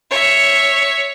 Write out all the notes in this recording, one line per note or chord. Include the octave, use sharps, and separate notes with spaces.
C#5 E5